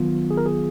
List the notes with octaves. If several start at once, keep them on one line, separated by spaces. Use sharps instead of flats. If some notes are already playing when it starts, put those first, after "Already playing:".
Already playing: D#3 F#3 B3 F4
G#4
A#4
G#4